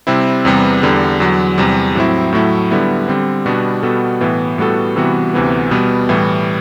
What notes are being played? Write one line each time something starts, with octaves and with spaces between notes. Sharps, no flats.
C3 G3 C4 E4
E2 C3 G3 B3
E2 D3 G3
E2 D3 F#3
E2 C3 G3
A2 F#3 C4 E4
A2 F#3 A3 E4
D3 G3 B3 E4
D3 G3 C4
B2 G3 B3 D4 F#4
B2 G3 B3 F#4 A4
A2 E3 B3
A2 G3 B3 F#4 A4
C3 E3 G3 B3 F#4
D2 C3 E3 B3
B2 G3 B3
A2 E3 G3